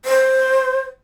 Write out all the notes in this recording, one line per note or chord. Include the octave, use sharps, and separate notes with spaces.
C5